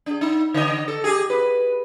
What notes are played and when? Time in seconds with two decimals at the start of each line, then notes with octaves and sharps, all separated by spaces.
0.06 D4 G#4
0.21 D#4
0.54 D3 D#5
0.88 A4
1.04 G4 G#4
1.30 B4